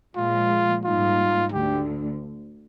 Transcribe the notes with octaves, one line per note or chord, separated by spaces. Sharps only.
A#2 F3 G#3 F4
G#2 G3 A#3 D#4 F4
D2 D3 G4